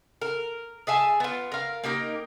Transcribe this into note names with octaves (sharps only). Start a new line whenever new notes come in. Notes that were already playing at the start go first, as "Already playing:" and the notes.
A#4
G#4 E5 G#5 A5
B3 F4
A#4 F5
A#3 D#4 G4 A#4